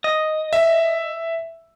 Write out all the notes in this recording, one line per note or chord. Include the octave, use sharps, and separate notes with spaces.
D#5
E5